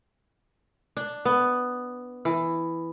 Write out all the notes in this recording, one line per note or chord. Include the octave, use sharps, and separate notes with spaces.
D4
B3
E3